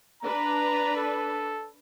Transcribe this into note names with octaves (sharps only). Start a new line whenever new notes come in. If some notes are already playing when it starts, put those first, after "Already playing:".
D4 B4 A#5
A4